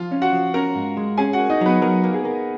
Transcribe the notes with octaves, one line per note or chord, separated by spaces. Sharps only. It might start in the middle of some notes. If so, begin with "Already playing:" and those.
Already playing: F3 F4 F5
C#4
F#4 F#5
F3
C#4 A#4 A#5
G#2
G#3
C#4 G#4 G#5
F#4 F#5
A#3
D#4 D#5
F#3 B3 B4
F#3 A#4
A#3
G#4
A#3